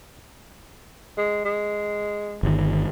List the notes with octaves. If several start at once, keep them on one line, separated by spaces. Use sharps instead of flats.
G#3
G#3
G1 D#3